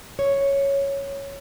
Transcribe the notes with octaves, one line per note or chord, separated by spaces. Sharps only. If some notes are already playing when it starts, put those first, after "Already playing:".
C#5